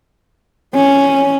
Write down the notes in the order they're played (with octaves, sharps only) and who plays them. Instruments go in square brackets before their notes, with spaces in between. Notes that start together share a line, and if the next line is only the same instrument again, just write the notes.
[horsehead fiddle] C#4